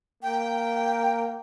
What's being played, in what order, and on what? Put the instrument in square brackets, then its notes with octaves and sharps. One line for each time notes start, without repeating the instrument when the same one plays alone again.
[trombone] A#3 [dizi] G5